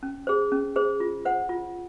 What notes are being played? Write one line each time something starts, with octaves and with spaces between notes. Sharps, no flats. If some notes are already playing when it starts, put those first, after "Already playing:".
C#4
G#4 C5
C#4
G#4 C5
F4
C5 F#5
F4